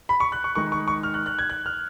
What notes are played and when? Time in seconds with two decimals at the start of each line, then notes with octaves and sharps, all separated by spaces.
0.09 B5
0.20 C#6
0.32 F#6
0.44 C#6
0.55 D#3 G#3 D#4 C#6
0.72 C#6
0.88 C#6
1.03 F6
1.14 F#6
1.26 F#6
1.39 G#6
1.50 F#6
1.66 F6